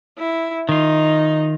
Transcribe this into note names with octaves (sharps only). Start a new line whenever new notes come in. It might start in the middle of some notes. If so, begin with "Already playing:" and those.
E4
D#3 D#4 F4